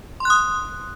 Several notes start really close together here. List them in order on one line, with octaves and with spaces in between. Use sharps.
C6 F#6 D#6